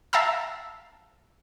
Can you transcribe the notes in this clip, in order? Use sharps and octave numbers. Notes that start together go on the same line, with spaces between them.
E5 F5 A5 A#5 E6